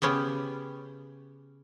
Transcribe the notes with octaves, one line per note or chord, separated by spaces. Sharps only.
C#3 B3 C#4 G4